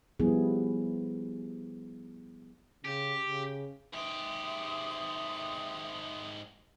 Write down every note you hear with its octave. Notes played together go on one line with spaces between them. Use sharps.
F3 G3 B3 E4 G#4
C#3 G4
C#3
G#2 G4 E5 C6 D#6